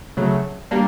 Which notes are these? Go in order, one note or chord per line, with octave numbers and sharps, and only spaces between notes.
C#3 F#3 A3
G3 A#3 D4